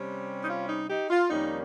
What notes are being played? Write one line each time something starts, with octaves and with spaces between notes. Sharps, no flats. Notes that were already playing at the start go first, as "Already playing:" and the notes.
Already playing: C3 G3 C#4
D#4
F4
D#4
D#4 G4
F4
F2 D#3 G3 A#3 C#4 D#4